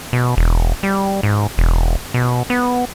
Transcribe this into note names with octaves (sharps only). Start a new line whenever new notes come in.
B2
E1
G3
G#2
E1
B2
B3